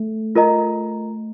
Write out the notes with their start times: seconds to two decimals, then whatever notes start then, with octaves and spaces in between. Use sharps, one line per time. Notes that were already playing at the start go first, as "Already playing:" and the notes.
Already playing: A3
0.35 F4 A#4 D#5 A#5